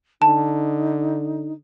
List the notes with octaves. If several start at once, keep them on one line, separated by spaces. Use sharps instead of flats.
D3 D#4 A5